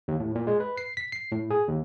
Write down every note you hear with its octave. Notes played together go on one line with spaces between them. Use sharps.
D#2
A2
A#2
G#3
B4
C7
B6
C7
A2
G#4
D#2